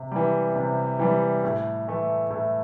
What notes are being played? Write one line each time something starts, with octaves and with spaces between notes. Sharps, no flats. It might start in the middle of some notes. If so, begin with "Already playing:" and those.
Already playing: C3
E3 G3
C3
E3 G3
A2
E3 A3
A2